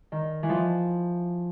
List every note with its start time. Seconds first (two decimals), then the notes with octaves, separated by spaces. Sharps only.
0.12 D#3
0.43 E3
0.49 F3